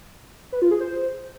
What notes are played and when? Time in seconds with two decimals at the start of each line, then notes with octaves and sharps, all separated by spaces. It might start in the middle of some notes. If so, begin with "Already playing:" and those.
0.52 B4
0.62 F4
0.71 G#4
0.81 C5